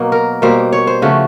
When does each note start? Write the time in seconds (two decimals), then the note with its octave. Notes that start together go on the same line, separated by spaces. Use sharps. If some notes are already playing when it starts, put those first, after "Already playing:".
Already playing: B2 F#3 A#3
0.12 A#4
0.42 B2 G3 A#3 C5
0.73 C#5
0.87 C5
1.02 C#3 F3 A3 F#4